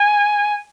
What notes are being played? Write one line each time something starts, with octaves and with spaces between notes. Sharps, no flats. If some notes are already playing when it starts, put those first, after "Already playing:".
Already playing: G#5